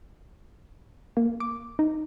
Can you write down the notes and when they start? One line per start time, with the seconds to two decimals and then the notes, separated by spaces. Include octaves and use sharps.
1.17 A#3
1.40 D6
1.79 D#4